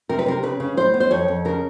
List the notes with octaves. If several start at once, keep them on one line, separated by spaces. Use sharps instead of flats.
C3 A#4
B4
C3 A#4
C#3 B4
C#3
A2 C5
B3
C5
F2 C#5
F2
C#3 A#4